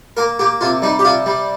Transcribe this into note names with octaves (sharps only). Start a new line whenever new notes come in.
A#3 A#4
A#3 G4
C3 F4
G3 D#4
G4
C3 F4
G3